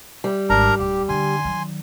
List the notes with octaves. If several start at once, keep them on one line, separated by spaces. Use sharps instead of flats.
G3
G#1 D4 A#4 A#5
D1 G4
D3 G#5 C6
D#3 F#3